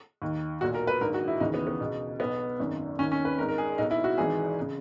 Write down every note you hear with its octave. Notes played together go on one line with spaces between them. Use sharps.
D#2 D#3
B1 A#2 F#4
A#4
B4
A#1 G#2 D#3 A#4
F#4
E4
D#2 C#3 E3 D#4
B3
B3
C#2 B2
B1 B2 B3
G#1 F#2 D#3
D#2 D#3 C#4
C#4
B4
G#1 G#2 D#3 A#4
A#4
G#4
B1 B2 D#4
E4
F#4
G#1 G#2 E3 G#4
C#3